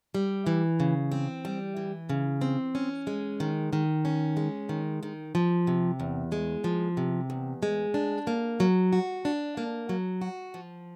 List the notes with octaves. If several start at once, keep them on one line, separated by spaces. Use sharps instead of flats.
G3
E3
C#3
C4
G3
E3
C#3
C4
C#4
G#3
D#3
D#3
C#4
G#3
D#3
D#3
F3
C3
E2
G#3
F3
C3
E2
G#3
D4
A#3
F#3
F#4
D4
A#3
F#3
F#4
F3